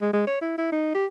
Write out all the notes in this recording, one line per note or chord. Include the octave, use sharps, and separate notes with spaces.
G#3
G#3
C#5
E4
E4
D#4
G4